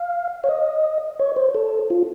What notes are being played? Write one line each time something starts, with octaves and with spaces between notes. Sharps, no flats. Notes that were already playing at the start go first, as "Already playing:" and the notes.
Already playing: F5
C#5
D#5
C#5
C5
A4
F4